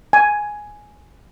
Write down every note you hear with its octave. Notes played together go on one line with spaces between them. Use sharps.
G#5